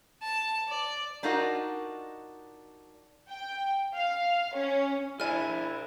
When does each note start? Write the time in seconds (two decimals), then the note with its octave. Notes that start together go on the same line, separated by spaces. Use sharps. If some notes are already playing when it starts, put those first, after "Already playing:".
0.23 A5
0.69 D5
1.23 D4 D#4 F4 F#4 A#4 D#5
3.29 G5
3.95 F5
4.54 C#4
5.20 E4 G#4 A#4 D5 G#5 F6